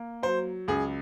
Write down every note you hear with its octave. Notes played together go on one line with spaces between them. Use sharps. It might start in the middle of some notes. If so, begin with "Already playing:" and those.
Already playing: A#3
F#3 C5
C#2 G#4